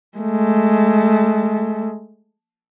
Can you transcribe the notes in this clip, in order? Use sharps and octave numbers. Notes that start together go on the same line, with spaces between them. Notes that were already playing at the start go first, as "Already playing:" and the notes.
G#3 A3